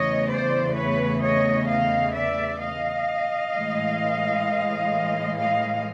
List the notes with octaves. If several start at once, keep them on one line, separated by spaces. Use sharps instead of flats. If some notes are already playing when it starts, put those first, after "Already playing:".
Already playing: E2 C#3 E3 A3 C#5 D#5
C5 D5
B4 C#5
C#5 D#5
D#5 F5
D5 E5
D#5 F5
A2 E3 G#3
D#5 F5